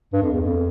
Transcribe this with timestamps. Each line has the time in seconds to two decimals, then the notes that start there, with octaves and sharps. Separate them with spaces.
0.13 G2
0.22 F2
0.31 E2
0.41 F2